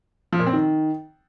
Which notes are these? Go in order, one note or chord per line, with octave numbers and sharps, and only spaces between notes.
F3
A#2
C4
D#3